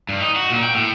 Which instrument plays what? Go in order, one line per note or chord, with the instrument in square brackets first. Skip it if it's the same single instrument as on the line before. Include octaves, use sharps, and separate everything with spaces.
[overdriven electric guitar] G2
D#4
F#4
A#2
G5
A2